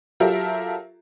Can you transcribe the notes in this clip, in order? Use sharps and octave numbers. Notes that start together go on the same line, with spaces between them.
F#3 F4 G4 A4 A#4 E5